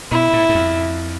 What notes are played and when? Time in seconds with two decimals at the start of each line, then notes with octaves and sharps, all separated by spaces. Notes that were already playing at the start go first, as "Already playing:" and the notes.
0.11 B2 E4
0.33 A2
0.49 G#2
0.55 F2